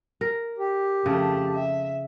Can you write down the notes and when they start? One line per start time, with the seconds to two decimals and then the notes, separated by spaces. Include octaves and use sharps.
0.21 A#4
0.58 G4
1.06 F2 C#3 A3 A5
1.54 E5